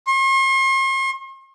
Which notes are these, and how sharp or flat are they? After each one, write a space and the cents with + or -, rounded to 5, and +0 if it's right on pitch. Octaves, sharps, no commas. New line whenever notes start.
C6 +45